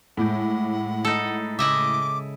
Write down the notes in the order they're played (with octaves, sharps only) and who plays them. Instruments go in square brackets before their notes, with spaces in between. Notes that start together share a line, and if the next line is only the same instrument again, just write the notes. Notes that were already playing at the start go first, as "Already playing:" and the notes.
[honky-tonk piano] A2 [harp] G#3 D6 G6 [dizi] F#5
[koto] D#4 A4
[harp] C#3 [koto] E4 D#5 E5 [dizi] D6